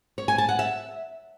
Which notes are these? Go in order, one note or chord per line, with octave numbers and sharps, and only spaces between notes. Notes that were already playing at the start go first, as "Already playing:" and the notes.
C#5
G#5
A5
F#5
E5